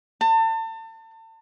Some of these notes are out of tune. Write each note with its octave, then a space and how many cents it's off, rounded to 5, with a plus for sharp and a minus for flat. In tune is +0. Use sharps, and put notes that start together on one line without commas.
A5 +35